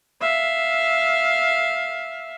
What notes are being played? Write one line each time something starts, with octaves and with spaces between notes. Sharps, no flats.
E5 F5